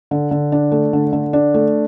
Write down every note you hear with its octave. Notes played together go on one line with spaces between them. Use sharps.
D3
D3
D4
A3
D3
D3
D4
A3